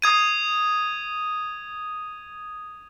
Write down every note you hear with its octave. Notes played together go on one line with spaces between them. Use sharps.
D#6 G#6 D#7